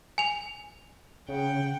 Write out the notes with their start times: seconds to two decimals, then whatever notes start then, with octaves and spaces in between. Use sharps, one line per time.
0.18 G#5 F7
1.29 C#3 F#5 G5